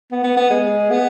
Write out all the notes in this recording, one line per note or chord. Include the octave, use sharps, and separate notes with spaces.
B3
B3
B3
G#3
B3